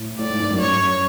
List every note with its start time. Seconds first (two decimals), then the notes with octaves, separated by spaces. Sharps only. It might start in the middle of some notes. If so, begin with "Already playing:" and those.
Already playing: A2
0.19 A2 D5
0.30 G#2
0.40 G2
0.50 F#2
0.61 C#5